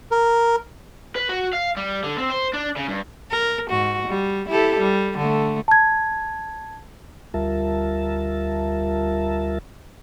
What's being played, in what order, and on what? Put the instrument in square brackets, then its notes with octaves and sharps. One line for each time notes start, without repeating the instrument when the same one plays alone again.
[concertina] A#4
[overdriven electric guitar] B4
F#4
F5
G3
D3
C4
C5
D4
C#3
G2
[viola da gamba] A#4
G#2 F#4
G3
E4 G4 A4
G3
D3 A3
[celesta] A5 G#6
[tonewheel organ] D2 G3 F4 A#4 E5 A5